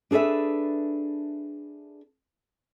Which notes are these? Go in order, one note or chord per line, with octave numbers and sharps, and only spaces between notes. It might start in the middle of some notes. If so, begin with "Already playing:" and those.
D4 G#4 A4 B4 E5